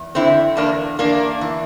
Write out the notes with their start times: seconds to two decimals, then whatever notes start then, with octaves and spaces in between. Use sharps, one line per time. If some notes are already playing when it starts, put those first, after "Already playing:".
Already playing: E2
0.15 D3 C4 E4
0.57 E2 A#3 D4
0.99 E2 A#3 D4
1.41 E3